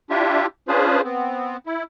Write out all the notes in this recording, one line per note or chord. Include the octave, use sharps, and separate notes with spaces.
D4 E4 F4 G4 E5
C#4 D4 F4 G#4 B4 C5
B3 C4
E4